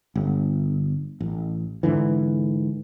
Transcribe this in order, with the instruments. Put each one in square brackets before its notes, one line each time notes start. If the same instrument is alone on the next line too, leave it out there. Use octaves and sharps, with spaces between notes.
[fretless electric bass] G1
A1
G#2 D3 E3